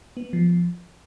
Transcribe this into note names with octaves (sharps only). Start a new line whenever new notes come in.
B3
F3